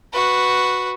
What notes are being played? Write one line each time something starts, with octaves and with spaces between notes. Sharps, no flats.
F#4 B4